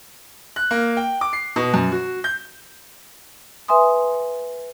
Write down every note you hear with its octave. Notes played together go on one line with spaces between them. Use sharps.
F#6
A#3
G5
D6
C7
B2
F#2
F#4
G6
B4 E5 G#5 C6 D#6